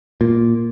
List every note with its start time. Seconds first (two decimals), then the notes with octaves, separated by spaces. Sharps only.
0.21 A#2